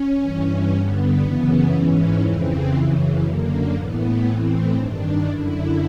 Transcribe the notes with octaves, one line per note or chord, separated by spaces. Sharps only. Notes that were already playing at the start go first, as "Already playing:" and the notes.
Already playing: C#4
G2 E3
G2 D3 B3
F#2 C#3 E3
G#2 E3 C#4
F2 C#3 E3 C4
F#2 C#3 E3
F#2 D3 A#3
A2 E3 B3
A2 E3 C4
G2 D#3 D4
F#2 D3 E4